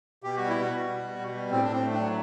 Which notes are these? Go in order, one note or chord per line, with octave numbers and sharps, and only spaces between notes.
B2 G4
G3 F#4
E4
B2 F#4
G3
B2
G3
B2
G3
A2 C4
D4
A2 C4
A3
D4
F#3